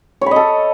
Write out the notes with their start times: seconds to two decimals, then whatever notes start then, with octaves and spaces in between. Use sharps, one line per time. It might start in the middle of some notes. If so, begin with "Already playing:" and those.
0.21 C#5
0.26 B5
0.31 D#5
0.36 A4